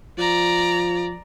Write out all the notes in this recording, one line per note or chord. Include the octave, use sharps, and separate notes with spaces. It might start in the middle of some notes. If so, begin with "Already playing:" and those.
F3 D5 A#5